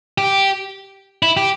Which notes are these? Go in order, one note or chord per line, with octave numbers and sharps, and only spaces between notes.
G4
E4
G4